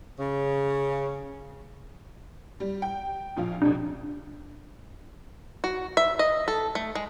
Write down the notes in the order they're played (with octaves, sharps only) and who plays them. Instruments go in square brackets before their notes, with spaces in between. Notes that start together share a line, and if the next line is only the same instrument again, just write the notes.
[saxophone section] C#3
[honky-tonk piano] G3
G5
A#1 F3 F5
[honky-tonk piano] B1 F2 C3 [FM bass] D4
[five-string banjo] F#4
E5
D#5
A4
A3
G#3